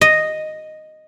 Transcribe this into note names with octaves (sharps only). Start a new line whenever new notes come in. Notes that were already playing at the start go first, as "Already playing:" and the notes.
D#5